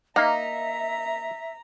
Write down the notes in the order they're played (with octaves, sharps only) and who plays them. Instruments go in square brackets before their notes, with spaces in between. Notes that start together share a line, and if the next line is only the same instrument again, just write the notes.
[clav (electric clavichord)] A#3 F5 [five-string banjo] D#4 [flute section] E5 [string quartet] A#5